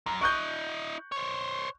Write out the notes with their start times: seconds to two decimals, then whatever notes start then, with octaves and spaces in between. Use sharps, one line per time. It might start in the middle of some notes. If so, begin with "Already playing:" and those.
0.06 F#2 A#5
0.21 E4 D#5 C#6 F#6 G6
1.12 C5 C#5